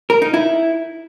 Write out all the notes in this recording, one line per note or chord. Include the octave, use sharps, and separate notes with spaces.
A#4
D#4
E4